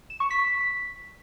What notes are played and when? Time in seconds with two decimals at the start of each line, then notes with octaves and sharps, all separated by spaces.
0.10 E7
0.20 C#6
0.30 B6